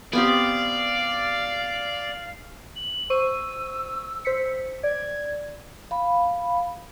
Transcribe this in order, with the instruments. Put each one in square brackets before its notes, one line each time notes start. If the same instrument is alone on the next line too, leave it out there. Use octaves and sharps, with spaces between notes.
[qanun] B3 C4 G4 [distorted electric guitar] D5 [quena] F5
[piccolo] F#7
[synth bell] C5 C#6 D#7 [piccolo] E6
[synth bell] C5 B6 C#7
[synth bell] D5 [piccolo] G#6
[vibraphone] F5 B5